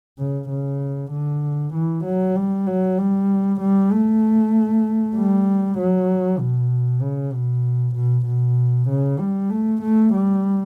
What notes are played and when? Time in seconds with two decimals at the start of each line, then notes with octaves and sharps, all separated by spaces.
0.18 C#3
0.49 C#3
1.11 D3
1.73 E3
2.04 F#3
2.36 G3
2.66 F#3
2.97 G3
3.60 G3
3.91 A3
5.16 G3
5.78 F#3
6.39 B2
7.02 C#3
7.32 B2
7.95 B2
8.26 B2
8.89 C#3
9.20 G3
9.50 A3
9.82 A3
10.13 G3